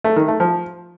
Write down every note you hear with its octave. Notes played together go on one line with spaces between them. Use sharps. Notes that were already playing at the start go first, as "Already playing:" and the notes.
A3
D#3
A3
F3